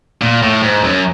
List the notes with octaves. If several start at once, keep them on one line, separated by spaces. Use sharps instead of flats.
A#2
A2
G#2
F#2